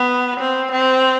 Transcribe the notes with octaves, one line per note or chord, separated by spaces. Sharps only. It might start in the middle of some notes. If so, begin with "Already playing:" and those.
Already playing: B3
C4
C4